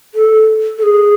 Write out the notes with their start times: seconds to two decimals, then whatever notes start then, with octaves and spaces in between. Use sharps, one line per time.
0.14 A4
0.78 A4
0.83 G#4